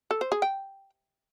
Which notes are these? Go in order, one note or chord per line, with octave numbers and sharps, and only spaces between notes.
A4
C5
G#4
G5